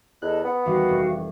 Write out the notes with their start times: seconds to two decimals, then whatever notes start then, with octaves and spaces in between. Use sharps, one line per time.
0.22 E2 A4 D#5 F#6
0.45 B3 F#5
0.65 D#2 E3 G3 F#4 F5
0.89 F1